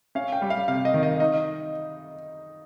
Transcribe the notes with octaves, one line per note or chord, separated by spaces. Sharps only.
C#4 F5
G5
G3
F5
C3 F5
D#5
D#3
D#5
D#4 D#5